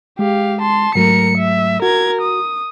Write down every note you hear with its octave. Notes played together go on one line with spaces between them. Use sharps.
G#3 G4 F5
A5 C6
G#2 F#3 A3 A#4 C#7
E5
F#4 A#4 G#6
D#6